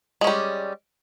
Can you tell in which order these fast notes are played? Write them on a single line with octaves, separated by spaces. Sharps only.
G#3 C#4 G3